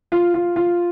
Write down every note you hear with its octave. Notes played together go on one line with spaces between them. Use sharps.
F4
F4
F4